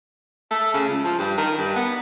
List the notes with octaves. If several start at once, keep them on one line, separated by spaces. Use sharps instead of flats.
A3
C#3
C#2
F3
G2
D#3
G2
B3